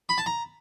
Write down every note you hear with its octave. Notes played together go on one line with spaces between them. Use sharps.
B5
A5
A#5